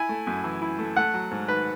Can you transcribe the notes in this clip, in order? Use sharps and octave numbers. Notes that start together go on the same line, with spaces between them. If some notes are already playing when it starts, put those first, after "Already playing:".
Already playing: E4 G#5
A3
F#2
E3
E4
A3
A3 F#5
F#3
G#2
D#3 B4